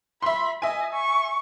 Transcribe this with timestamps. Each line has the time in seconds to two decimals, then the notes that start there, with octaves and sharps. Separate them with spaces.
0.22 E5 B5 C6
0.62 D#5 E5 G#5
0.93 C#6